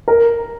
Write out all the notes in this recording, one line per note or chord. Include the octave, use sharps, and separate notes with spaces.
A#4